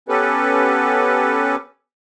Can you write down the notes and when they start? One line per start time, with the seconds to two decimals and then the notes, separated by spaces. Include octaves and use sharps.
0.09 B3 C#4 G4 A4 B4